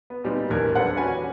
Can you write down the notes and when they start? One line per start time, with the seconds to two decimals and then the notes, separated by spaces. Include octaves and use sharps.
0.10 B3
0.24 A#2 G3 B3 C4 D#4
0.50 D#1 A#1 E2 A#4 G#6
0.75 D4 G4 A4 B4 C5 F#5
0.97 C#4 F#4 G#5 B5